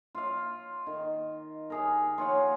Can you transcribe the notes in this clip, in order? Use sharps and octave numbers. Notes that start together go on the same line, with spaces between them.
F4 F5
D#3
G4 G#4 A#4
F4 C#5 F#5